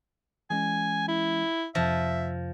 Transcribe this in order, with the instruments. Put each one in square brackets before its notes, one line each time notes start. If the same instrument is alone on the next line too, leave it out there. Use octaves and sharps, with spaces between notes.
[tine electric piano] E3 G#3 C#4 [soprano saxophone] G#5
[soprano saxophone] E4
[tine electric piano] F2 C3 A#6 [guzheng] F3 [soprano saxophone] E5